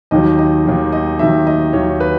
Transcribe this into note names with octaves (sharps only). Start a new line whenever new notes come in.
D#2 D#3 F#3 D#5
D#5
D#2 D#3 F#3
D#5
D#2 D#3 F#3 E5
D#5
D#2 D#3 F#3 C#5
B4